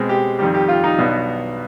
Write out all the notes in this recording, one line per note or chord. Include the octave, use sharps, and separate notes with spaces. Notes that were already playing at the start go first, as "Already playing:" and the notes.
Already playing: B2 G#3 C4
G4
F2 D#3 G3 G4
G4
F4
D#4
B1 B2 B3 D4